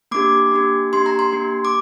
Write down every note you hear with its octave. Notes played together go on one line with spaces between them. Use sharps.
A#3 D4 G4 D6
A#3 D4 G4
A#3 D4 G4 C6
A#5
C6
A#3 D4 G4
D6